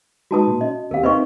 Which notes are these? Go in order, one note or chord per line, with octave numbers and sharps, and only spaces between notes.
G#3 D#4 F#4 B4 A5 D#6
A#2
C#4 D#5
D#2 C4 G4 A#4 F5
C4 D#4 B4 D#5 C#6